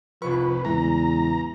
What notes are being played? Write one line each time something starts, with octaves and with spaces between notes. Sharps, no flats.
F1 C2 F3 B4 C#6
E2 A2 C#3 E3 G#3 A#5